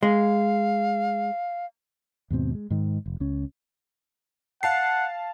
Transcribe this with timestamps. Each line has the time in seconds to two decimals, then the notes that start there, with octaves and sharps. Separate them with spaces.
0.03 G#3 F5
2.30 D#2 G#2 B2 C4
2.55 G#3
2.70 G#2 D#3
3.06 F1
3.20 C#2 C#4
4.63 F5 F#5 A5 C7